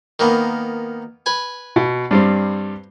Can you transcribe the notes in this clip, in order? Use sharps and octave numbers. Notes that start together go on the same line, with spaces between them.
D#3 A#3 B3
B4 G#5
B2
G2 G3 C4